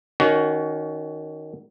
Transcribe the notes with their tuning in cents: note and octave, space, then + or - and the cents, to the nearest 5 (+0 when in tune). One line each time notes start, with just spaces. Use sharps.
D#3 +0 C#4 +25 F#4 +15